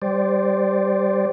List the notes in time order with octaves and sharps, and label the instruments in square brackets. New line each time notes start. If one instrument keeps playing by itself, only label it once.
[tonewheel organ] G3 C5 D5